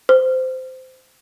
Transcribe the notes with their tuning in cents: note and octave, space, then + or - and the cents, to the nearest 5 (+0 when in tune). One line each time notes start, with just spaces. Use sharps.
C5 -15